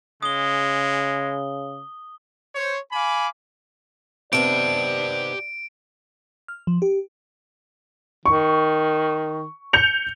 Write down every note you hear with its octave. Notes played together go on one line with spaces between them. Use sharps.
C#3 G#3 D#6 G7
C5 C#5
F5 G#5 B5 D6
C3 D#3 B3 G4 D5 A5 D7
F6
F3
G4
D#3 C#6
G6 C#7 F7